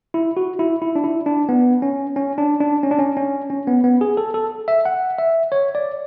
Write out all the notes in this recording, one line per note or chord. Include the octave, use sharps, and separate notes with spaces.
E4
F#4
E4
E4
D4
E4
D4
B3
C#4
C#4
D4
D4
C#4
D4
C#4
C#4
C#4
B3
B3
G#4
A4
A4
E5
F#5
E5
C#5
D5